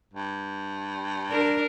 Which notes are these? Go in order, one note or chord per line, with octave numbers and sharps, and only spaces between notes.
G2
D4 A#4